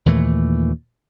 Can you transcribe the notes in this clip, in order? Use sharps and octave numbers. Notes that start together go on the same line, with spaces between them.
D#2 A#2 E3 A3